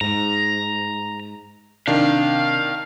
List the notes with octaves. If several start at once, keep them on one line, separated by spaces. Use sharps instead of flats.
G#2 A#5
C3 D#3 D4 F5